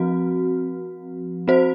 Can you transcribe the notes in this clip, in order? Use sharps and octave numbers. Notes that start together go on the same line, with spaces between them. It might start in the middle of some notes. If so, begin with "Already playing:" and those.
Already playing: F3 C4 F#4
C4 F#4 C5